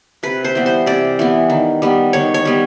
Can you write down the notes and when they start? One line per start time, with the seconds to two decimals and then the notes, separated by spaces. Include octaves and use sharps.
0.23 C3 B4
0.44 C5
0.55 E3 G3 B3
0.66 C5
0.86 C3 D5
1.19 E3 G3 B3
1.50 D#3
1.82 G3 B3
2.13 D#3 C#5
2.34 C#5
2.45 G3 B3